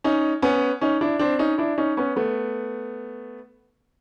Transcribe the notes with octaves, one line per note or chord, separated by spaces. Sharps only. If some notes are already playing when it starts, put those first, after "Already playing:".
C#4 D#4
B3 C#4
C#4 D#4
D4 E4
C4 D4
C#4 D#4
D4 E4
C#4 D#4
B3 C#4
A3 B3